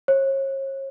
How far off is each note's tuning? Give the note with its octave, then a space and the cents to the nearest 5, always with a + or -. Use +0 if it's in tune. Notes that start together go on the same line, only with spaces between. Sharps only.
C#5 -40